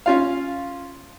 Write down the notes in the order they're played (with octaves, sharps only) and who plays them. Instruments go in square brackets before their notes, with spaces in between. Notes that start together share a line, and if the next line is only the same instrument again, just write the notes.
[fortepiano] C#4 F4 F5